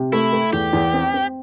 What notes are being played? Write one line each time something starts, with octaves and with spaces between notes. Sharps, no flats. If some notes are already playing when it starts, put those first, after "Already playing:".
Already playing: C3
A3 E4
A3
E2 G4
E2
C4
C4